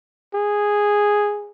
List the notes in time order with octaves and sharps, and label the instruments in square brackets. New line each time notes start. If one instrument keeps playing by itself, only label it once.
[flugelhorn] G#4